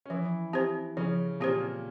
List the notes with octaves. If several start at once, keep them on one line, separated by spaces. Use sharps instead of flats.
C#4
E3 F3 E4
C4 G4 C5
C#3 F3 C#4
A#2 A#3 C4 G4 C5